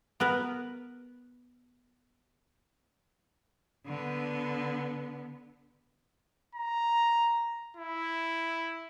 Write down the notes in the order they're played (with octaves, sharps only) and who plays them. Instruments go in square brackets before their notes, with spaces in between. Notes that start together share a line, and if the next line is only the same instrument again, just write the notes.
[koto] B3 A#4 B4
[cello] D3 B3
[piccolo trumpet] A#5
E4